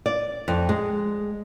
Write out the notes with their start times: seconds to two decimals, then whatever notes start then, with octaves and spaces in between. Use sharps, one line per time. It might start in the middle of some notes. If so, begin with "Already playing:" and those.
0.06 D5
0.48 F2
0.69 G#3